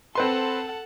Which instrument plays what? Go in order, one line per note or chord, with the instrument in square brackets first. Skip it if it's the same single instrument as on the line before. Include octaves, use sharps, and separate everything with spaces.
[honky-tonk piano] C4 B4 C6 [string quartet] A4 F#5 A5